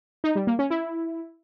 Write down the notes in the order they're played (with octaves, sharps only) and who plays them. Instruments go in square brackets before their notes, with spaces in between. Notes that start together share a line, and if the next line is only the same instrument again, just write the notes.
[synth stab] D#4
G3
A#3
C#4
E4